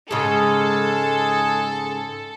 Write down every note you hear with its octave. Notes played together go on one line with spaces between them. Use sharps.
G#2 C#3 G#3 G#4 A4